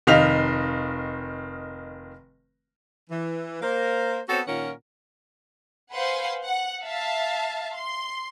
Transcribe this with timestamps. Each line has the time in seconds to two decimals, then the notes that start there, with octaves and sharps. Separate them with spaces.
0.07 F1 D#3 D#5 F5 B6 F7
3.10 E3
3.62 A#3 A#4 C5
4.29 B3 C4 F#4 A4 C5 C#5
4.47 A#2 D#3 C#4 F4 A#4 F#5
5.92 B4 C5 F5 F#5 G#5 C6
6.44 F#5
6.83 E5 F5 A5
7.76 C6